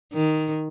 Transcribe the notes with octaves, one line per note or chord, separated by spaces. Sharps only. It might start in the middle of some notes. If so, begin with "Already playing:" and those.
D#3